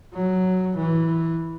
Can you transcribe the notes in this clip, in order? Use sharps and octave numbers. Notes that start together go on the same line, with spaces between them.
F#3
E3